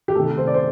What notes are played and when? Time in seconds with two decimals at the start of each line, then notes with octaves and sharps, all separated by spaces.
0.08 G4
0.15 C3 D#3 A3 A4
0.38 C5
0.47 D5
0.54 C5